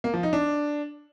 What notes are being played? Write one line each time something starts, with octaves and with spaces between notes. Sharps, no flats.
A#3
F3
D#4
D4